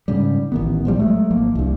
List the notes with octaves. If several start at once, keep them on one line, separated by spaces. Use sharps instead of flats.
G#2 C#3 G3
A1 D#3 B3
A1 F3 G3
F#3 G#3 A3
G#1 F3 A#3
C2 G2